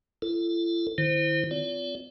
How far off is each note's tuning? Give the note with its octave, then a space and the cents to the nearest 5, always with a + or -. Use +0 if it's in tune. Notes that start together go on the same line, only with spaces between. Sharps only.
E4 +45 A4 +10
D#3 -35 E4 +0 C5 +0
C4 -35 F4 +0 D5 -45